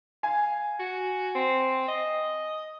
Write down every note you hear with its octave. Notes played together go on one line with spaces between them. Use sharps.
F5 G#5
F#4
C4
D#5